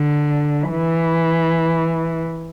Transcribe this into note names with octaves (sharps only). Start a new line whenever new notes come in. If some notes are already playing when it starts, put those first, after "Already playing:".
Already playing: D3
E3